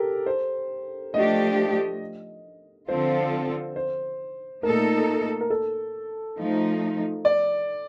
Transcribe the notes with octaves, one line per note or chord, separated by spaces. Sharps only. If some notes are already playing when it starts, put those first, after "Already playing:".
Already playing: G4 A4 A#4
C5
F3 A3 D4 G4 D#5
D3 F3 C4 F4 A4 C5
C5
A#2 A3 D#4 A4 A#4
A#4
A4
F3 A3 D#4
D5